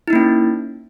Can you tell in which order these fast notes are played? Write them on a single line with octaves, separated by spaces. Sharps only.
E4 D#4 A#3 C#4